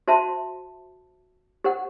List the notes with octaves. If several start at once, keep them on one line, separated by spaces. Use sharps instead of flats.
F#4 C5 E5 A5 C6
G4 C5 F#5